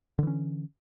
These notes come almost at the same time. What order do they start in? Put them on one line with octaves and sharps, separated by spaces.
D3 E3 C#4